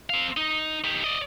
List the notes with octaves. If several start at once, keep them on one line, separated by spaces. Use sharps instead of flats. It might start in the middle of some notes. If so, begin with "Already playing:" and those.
C4 F5
D#4
D#4 G4
D5 D#5